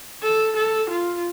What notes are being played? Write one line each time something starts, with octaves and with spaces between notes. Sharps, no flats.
A4
A4
F4